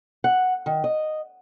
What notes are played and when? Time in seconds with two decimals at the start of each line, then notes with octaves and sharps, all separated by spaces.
0.24 F#5
0.66 D#3
0.84 D#5